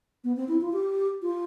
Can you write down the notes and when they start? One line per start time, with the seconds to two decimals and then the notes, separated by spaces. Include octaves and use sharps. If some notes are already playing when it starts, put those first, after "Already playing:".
0.24 B3
0.37 C4
0.48 E4
0.61 F4
0.73 G4
1.22 F4